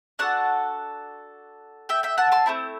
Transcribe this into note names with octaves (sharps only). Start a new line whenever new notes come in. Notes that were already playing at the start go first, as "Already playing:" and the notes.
D4 F#4 A4 F#5 A5
E5 G5
E5 G5
F#5 A5
A5 C6
A3 C4 E4